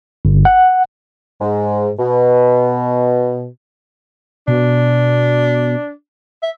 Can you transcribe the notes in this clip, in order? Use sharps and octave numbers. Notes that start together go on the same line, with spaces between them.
G1
F#5
G#2
B2
B2 D4
E5